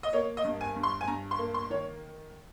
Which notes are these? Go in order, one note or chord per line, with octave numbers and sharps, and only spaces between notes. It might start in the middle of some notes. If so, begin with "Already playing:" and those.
D#5
A#3 C#5
D#5
G2
G#5
G2
C6
G#5
G2 A#5
C6
A#3
C6
D#3 C#5